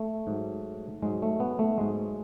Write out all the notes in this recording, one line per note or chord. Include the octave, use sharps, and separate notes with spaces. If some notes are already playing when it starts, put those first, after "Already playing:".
Already playing: A3
G#2 F#3
G#2 F#3 G#3
A3
B3
A3
G#2 F#3 G#3